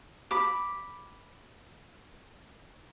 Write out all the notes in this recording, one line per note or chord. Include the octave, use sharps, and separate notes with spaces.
B5 D6